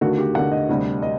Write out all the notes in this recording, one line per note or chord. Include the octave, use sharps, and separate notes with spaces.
D#2 D3 A3 F#4
G4
D#2 D3 A3 F#5
D#5
D2 C3 G3
C3 G3 D#5